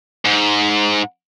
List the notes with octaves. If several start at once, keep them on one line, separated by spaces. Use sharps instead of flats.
G#2